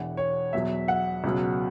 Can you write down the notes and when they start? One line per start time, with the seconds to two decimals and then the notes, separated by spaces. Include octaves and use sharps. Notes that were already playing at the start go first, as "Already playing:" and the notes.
Already playing: E1 E2 E3 F#5
0.17 C#5
0.53 E2 B2 F#3 E5
0.88 F#5
1.24 C#2 B2 F#3